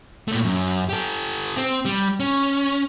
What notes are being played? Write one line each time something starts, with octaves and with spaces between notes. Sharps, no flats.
A#2 A3
F#2
G4 A4
C4
G3
C#4